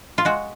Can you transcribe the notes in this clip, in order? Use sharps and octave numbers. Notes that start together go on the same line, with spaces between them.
F4
G#3 F#4